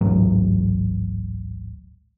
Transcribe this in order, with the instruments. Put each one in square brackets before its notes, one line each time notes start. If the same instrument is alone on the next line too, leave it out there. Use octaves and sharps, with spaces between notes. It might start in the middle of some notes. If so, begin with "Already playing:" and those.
[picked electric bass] D1 A1 G#2 F#3